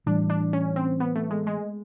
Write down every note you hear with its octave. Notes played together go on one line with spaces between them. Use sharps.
A2 E3 G3 D4
D4
C#4
C4
B3
A3
G#3
G#3